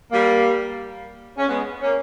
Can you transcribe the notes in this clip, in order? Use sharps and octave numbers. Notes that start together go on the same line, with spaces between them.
G3 A#3
C#4
G#3 B3
A#3 C#4